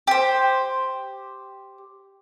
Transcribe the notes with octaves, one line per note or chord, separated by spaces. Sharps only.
G4 C5